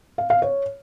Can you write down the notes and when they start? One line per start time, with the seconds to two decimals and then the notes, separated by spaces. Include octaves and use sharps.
0.18 F5
0.30 F5
0.42 C#5